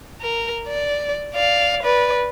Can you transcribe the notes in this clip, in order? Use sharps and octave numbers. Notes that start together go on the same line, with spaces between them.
A#4
D5
D5 F5
B4 D5